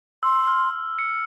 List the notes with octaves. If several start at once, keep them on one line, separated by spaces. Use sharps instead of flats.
C6 E6
F6
C#7